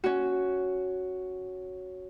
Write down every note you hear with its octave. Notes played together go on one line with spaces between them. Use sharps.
C#4 F#4